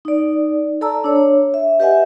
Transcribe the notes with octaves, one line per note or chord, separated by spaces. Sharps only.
D#4 D5
A4 D5 A5 A#5 E6
D4 C#5
E5
G4 B4 D#5 E5 F#5 G#5